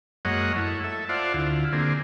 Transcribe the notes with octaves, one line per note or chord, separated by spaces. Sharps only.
F#2 G#3 A#3 C#5 D#5 F#5
A3 E4
A4 E5
F4 C5 D5 E5 F#5 A5
D2 E4 F4
D3 A#3 C4 G#4